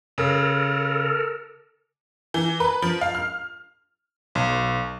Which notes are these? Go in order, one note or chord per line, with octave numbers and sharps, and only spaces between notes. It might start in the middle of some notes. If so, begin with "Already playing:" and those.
C#3 A4 A#4
E3
B4
F3
F5
F6
B1